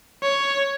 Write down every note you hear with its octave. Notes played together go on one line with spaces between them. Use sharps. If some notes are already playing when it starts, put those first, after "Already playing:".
C#5